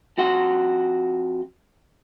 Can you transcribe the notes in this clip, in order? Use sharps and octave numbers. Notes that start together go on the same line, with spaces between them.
F2 F#4 F#5 C6